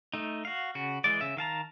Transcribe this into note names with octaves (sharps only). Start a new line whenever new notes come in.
A3 D#4
F#4 F5
C#3 F#4
E3 G#3 D5
C#3 E5
D#3 F5 A5 A#5